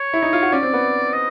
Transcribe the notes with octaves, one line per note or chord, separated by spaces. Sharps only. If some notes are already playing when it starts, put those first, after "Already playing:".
Already playing: C#5
E4
D#4
F4
F#4
C#4 D5
C4
B3
D#5